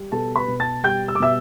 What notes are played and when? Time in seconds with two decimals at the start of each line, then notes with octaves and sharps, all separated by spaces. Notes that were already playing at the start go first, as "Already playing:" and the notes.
Already playing: G3
0.12 B2 A4 A5
0.36 B4 B5
0.48 B2
0.60 A5 A6
0.84 G3 G5 G6
1.08 E6
1.15 D6
1.20 B2 E5 E6